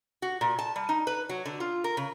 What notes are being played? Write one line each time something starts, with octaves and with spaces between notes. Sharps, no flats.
F#4
A#2
A5
G3
D#4
B4
F#3
D3
F4
A#4
C#3